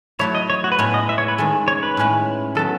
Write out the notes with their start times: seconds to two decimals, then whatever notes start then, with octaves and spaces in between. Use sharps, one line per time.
0.19 F#3 A3 E4 C#5
0.35 D#5
0.50 C#5
0.64 F#4
0.72 B4
0.79 A2 G#3 B3 E4 C#5
0.94 D#5
1.09 E5
1.18 C#5
1.28 B4
1.38 D#3 G#3 C#4 A4
1.68 C#5
1.83 B4
1.97 A2 G#3 C#4 E4
2.55 D#3 F#3 B3 A4